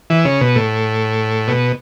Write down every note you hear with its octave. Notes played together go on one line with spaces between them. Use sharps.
E3
C#3
B2
A2
B2